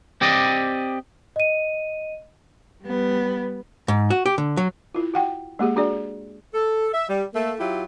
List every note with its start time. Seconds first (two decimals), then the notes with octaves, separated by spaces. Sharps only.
0.21 C4 G4 D5 D#5
1.36 D#5 D#7
2.83 G3 B3
3.88 G#2
4.10 F#4
4.26 G4
4.38 D3
4.57 F#3
4.95 E4 F4
5.14 F#4 F#5 G5
5.59 G#3 A#3 G4 G#4
5.76 D4 F#4 G#4 D5
6.54 A4
6.94 E5
7.09 G3
7.35 A3 A#3
7.60 F#3 E4 F4 G4